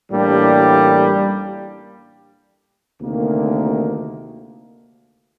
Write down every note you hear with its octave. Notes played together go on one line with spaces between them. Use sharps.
A1 A2 G3 A#3 D4
D2 C3 D#3 A#3